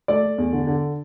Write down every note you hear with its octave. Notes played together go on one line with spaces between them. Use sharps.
A3 D5
A3
E2
D3
D3